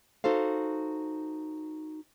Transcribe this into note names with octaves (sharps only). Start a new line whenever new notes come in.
D#4 F#4 A4 C5 F5